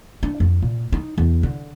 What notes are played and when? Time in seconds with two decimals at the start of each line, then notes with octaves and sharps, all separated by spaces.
0.23 D4
0.40 F2
0.62 A#2
0.92 D#4
1.18 E2
1.43 D3